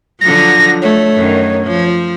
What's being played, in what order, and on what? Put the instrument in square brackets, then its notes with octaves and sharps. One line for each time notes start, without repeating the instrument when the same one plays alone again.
[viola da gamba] D3 F3 F#3 [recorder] A#6
[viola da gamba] A3 [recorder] C#5
[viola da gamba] F#2 D#3
F3